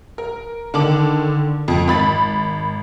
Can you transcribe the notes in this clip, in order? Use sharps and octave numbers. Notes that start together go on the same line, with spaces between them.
A#4
D3 D#3 A5 D6 F#7
F2
G#1 B5 A6